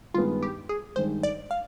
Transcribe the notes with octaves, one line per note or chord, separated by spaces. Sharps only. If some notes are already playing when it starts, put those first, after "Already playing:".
G2 D#3 G#3 B3 D#4 F4
G4
G#4
G2 D#3 G#3 C5
D5
F5